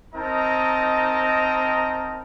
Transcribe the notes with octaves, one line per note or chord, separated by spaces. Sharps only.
C4 D#4 A#4 D#5 A5 A#5